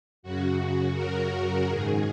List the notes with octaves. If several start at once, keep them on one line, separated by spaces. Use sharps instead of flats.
F#2 C#3 F#4
A#4
G#2 D#3 G#4